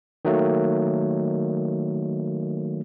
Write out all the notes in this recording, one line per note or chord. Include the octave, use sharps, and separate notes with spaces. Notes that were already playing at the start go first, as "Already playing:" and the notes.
D#3 F#3 A3 A#3